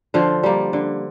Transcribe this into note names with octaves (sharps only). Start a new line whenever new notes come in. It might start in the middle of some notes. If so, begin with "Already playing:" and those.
D3 F3 F4
G3 A#3
D3